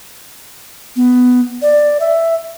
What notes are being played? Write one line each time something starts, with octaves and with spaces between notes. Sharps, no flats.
B3
D5
E5